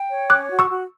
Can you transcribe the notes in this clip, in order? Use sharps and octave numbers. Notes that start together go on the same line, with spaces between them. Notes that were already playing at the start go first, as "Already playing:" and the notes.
Already playing: G5
C#5
C#4 D6 F#6
F#4
C#6 E6
F#4